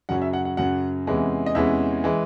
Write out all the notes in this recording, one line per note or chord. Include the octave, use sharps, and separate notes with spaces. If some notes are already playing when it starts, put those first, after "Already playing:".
F#2 C#3 F#3 C#4 F#5
E5
F#5
F#5
F#2 C#3 F#3 C#4 F#5
E2 C3 E3 G#3 C#4
D#5
E2 C3 E3 G#3 C#4 E5
E3 G#3